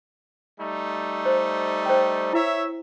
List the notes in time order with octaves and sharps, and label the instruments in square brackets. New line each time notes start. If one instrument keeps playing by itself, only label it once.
[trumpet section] G3 A3 D#4
[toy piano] C5 C6
C5 G5
[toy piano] E4 [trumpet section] C#5 E5